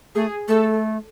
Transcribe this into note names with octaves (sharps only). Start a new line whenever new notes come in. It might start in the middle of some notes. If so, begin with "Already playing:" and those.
A3 G#4
A3 A4